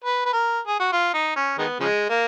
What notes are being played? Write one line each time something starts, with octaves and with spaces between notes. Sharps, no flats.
B4
B4
A#4
G#4
F#4
F4
D#4
C#4
D#3 G#3 B3
C#3 F3 G#3
A#3